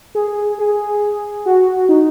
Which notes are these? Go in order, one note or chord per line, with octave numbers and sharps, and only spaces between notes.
G#4
G#4
F#4
D#4